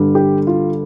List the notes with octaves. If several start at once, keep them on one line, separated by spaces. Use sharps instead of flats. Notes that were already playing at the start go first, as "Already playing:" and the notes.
Already playing: G1 G2 D3 G3
G4
F4